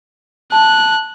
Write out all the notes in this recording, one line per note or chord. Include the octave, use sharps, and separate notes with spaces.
A5 F#6